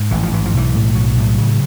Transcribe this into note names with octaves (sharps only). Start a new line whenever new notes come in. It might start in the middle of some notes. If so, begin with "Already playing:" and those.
Already playing: G#2
A1 E3
F3
G#2 E3
F3
B1 E3
A2
B1 F#3
A2
C#3